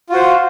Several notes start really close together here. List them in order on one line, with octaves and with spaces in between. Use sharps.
F4 F#4 C5